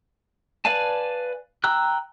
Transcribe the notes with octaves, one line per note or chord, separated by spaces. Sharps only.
B4 D5 F5 G#5 A5
G5 A#5 E6 F#6